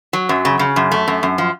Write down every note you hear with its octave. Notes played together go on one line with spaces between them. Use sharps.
F#3
F#2
C#3
C#3
F#2
A3
F#2
F#2
F3